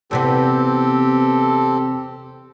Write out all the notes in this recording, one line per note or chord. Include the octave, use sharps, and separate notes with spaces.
E2 C3 B3 C4 G4 A4